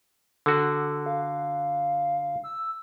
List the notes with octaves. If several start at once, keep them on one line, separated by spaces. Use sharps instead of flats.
D3 F#4 A4
F5
E6